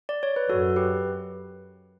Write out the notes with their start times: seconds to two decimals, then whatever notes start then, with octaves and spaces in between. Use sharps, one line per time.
0.09 D5
0.23 C#5
0.36 B4
0.49 F#2 F#4 A4
0.76 G4 B4